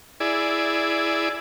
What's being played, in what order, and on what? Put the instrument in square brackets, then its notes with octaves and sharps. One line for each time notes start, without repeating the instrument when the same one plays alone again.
[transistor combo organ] E4 G#4 D5